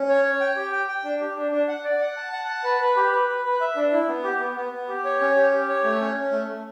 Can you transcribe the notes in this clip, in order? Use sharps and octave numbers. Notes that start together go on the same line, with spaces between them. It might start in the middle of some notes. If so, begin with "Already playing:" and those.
Already playing: C#4
C#5
C#5
G5
G4
G5
G5
D4
G4
D4
D4
F#5
D5
F#5
A5
F#5
A5
B4
B4
G4
B4
B4
B4
E5
D4
E4
B3
G4
B3
B3
B3
G4
C#5
C#4
G4
G4
C#5
A3
C#4
C#4
A3
A3